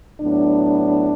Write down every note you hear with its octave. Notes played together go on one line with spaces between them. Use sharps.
A2 F#3 B3 D4